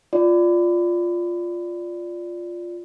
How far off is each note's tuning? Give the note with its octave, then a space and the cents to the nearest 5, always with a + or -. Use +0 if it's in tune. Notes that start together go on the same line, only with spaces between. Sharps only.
F4 +0 D5 +0